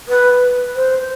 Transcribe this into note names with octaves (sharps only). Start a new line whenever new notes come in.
B4
C5